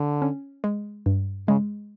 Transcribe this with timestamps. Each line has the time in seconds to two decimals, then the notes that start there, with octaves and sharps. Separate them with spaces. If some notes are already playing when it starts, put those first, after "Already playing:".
Already playing: D3
0.22 C#4
0.64 G#3
1.06 G2
1.48 C#3 G#3